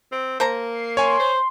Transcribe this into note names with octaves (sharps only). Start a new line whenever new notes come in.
C4
A#3 C5 A5 A#5
C7
C#5 G#5 C6
C5